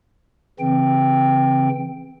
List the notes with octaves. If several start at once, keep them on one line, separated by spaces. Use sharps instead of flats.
C#3 E3 C4 G5